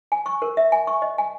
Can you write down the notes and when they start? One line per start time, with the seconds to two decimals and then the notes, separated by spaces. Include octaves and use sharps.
0.12 G#5
0.26 C#6
0.42 A#4
0.57 E5
0.72 G#5
0.87 C#6
1.02 D#5
1.18 G#5